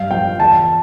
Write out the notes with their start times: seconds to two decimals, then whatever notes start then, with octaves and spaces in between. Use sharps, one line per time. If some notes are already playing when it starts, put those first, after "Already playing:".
Already playing: G2 F5
0.11 F3 G5
0.40 E2 A5